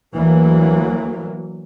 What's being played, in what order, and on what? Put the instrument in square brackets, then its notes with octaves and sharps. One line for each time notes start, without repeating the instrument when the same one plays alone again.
[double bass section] D2 E3 F#3 A#3